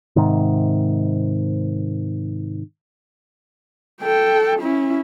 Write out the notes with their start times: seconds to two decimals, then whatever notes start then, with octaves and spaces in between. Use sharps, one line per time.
0.16 G#2 C3 D#3
4.02 A4 G5
4.60 C#4 E4